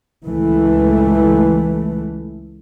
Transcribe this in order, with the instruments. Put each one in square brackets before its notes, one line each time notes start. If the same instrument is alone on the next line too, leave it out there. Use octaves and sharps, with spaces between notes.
[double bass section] C#2 E3 A3